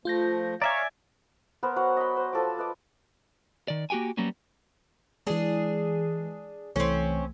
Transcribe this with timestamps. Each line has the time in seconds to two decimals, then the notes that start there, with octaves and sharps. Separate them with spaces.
0.05 F3 A3 F4 G6 A#6
0.62 C#5 D5 E5 F5 G#5 A#5 D6
1.63 B3 A#4 C5 B5
1.76 F#3 F#5
1.97 D#5 B5
2.16 C5
2.33 F3 A4 B5 D6
2.58 B4 D#5 D6
3.68 D#3 D5
3.90 A#3 F#4 G4 G5 G#5
4.17 F#3 G3 A#3 B3 C#4
5.27 E3 G#3 D4 G#4
6.76 C2 E3 A3 C4 C#4